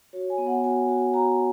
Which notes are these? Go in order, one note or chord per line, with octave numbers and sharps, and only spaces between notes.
F#4 C#5
G#5
B3
F#5
F#4 G#5
F#4
F#4 A#5